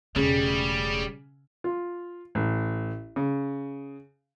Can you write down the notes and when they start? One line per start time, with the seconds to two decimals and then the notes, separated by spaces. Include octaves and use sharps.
0.16 E1 C#3 G3 A3
1.64 F4
2.35 A1
3.16 C#3